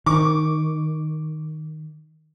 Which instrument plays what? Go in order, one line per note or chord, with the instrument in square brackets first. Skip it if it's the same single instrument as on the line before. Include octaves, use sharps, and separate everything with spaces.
[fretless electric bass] D#3 [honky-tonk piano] C#6 D6